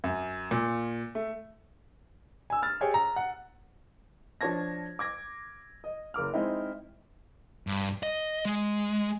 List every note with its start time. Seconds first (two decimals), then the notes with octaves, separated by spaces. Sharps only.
0.04 F#2
0.51 A#2
1.15 A3
2.50 G#5 E6
2.63 F6 A6
2.81 G4 G#4 C#5 G5
2.94 A#5
3.16 F#5
4.41 F3 D4 C#5 A5 G#6 A#6
4.99 D6 G#6 A#6
5.84 D#5
6.14 F#1 A#4 D6 F6
6.34 G#3 C4 D#4 E4
7.67 G2
8.03 D#5
8.45 G#3